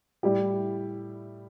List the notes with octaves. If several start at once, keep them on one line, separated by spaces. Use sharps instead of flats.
A2 G3 E4 G4